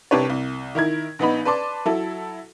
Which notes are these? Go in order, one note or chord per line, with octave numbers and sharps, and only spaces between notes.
C2 C3 D4 G4 B4 C#5
C2
D#3 E4 A#4 G#6
A#1 B3 D#4 B5
B4 D5 A5 C6 D6
F#3 E4 A4